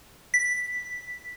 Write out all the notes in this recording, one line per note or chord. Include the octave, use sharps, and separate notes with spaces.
B6